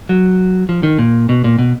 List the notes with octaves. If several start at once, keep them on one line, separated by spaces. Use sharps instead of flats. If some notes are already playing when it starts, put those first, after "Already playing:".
F#3
F3
D#3
A#2
B2
A#2
B2